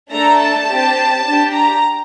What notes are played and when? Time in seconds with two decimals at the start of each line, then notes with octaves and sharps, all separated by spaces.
0.10 A3 D4 A4 A#5
0.38 A5
0.67 C4 G4
1.25 D4 G4
1.53 A#5